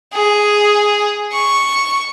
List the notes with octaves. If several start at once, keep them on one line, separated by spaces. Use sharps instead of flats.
G#4
C#6